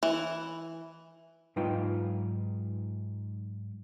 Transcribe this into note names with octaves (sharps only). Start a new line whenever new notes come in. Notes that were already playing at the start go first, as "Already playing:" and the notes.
E3
G#2 F#3 D#4 F4 B4 G5